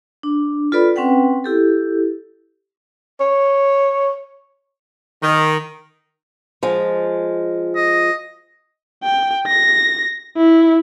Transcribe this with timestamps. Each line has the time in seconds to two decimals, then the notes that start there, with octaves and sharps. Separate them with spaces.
0.23 D4
0.72 F4 A4 B4 D5 B5
0.96 C4 C#4 B4 F#5 G5
1.44 E4 G4 A4
3.20 C#5
5.23 D#3
6.63 F3 G#3
7.75 D#5
9.04 G5
9.47 A#6
10.37 E4